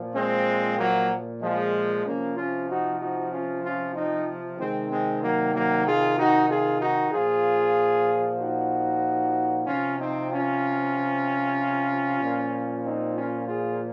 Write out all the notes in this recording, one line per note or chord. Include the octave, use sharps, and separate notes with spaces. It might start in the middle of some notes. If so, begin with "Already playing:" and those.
Already playing: A#2 F3
G#3 C4
F#3 A#3
F3 G#3
C3 F3 A#3 C#4
C#4 F4
D#4 F#4
D#4 F#4
C#4 F4
C#4 F4
C4 D#4
C3 D#3 G#3 C4
G#3 C4
F#3 A#3
F#3 A#3
F4 G#4
D#4 F#4
F4 G#4
D#4 F#4
A#2 F3 F4 G#4
D#4 F#4
C3 F3 C#4 F4
C4 D#4
C#4 F4
A#2 F3
C4 D#4
C#4 F4
F4 G#4